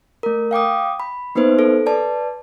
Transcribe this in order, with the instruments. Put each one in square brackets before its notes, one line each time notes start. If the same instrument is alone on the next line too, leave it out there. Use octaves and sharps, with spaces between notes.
[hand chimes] A3 A#4
F5 G5 D6 D#6
B5
A#3 B3 D#4 B4 C5
A4
B4 D5 A5